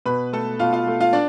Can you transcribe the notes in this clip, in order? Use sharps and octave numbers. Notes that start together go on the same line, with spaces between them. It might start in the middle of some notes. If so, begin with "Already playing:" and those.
B2 B4 B5
A3 A4 A5
B2 F4 F5
F4 F5
A3
F4 F5
D4 D5